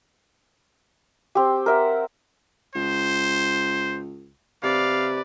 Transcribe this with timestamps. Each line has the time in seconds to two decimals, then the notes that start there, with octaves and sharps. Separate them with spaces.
1.35 C4 G4
1.66 A#4 E5 F#5
2.75 C#2 C5
4.63 C3 B4 D5 F5